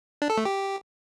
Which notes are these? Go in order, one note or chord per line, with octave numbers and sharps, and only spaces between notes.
D4
A4
A3
G4